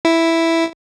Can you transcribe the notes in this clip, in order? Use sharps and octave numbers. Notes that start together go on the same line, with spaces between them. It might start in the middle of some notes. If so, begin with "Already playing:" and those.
E4